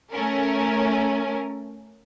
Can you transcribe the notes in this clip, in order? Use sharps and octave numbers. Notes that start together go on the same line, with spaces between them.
A3 C#4 A#4